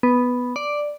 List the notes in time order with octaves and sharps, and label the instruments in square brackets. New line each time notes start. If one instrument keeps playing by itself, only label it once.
[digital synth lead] B3
D5